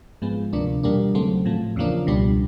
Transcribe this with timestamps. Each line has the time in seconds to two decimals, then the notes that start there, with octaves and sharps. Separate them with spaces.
0.22 G#2 F3 G#3 B3
0.53 D2 C3 F3 A#3 D4
0.83 E2 B2 G3 A#3 D4
1.15 C#3 F#3 A3 C4
1.45 A2 F3 A3
1.76 E2 C#3 F3 A#3 D4
2.07 C#2 B2 G3 B3 D4